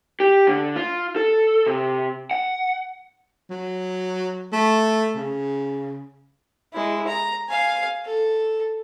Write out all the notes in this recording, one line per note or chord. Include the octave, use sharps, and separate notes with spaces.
G4
D3
F4
A4
C3
F#5
F#3
A3
C#3
G#3 E4
A#5
F5 G#5
A4